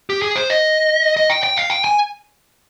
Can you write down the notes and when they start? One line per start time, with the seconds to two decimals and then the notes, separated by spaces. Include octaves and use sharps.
0.10 G4
0.22 G#4
0.36 C5
0.50 D#5
1.17 D#5
1.30 G5
1.44 G5
1.57 F5
1.70 G5
1.84 G#5